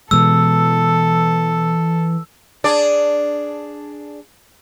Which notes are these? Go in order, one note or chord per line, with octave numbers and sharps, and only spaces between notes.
B2 E3 G#3 A4 E6
D4 G#4 D5